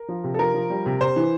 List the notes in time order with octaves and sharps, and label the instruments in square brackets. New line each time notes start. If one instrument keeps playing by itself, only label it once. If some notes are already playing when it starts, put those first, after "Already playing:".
Already playing: [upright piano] A#4
F3
C3
A4
F3 A#4
F3
G3
C3
C3 C5
E3